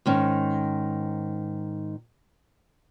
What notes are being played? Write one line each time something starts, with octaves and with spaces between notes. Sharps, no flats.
G#2 D#3 C#4